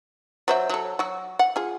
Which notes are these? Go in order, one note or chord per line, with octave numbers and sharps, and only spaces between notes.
F#3 C5 E5
F#3 A4
F#3 F#4
F#5
F4 G#4